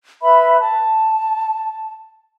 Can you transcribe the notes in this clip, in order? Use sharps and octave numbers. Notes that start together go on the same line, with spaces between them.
B4 E5 B5
A5